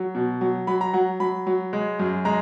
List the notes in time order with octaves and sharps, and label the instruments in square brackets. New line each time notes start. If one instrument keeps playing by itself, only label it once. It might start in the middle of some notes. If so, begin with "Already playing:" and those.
Already playing: [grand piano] F#3
B2
F#3
F#3 B5
A#5
F#3 F#5
F#3 B5
F#3
G#3
F#2
G#3 A#5